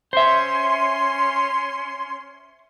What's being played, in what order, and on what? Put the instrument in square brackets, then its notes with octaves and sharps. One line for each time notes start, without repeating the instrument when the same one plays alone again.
[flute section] C#4 C6 [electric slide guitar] C5 E5